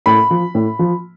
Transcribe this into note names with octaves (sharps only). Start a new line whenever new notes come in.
A2 B5
F3
A2
F3